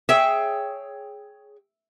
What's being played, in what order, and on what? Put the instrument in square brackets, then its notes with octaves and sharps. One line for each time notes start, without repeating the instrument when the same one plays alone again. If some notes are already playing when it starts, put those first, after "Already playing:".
[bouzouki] G#4 C#5 G5 [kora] E5